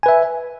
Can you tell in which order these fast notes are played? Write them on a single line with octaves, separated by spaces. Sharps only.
G#5 B4 E5